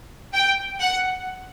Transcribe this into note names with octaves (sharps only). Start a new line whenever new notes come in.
G5
F#5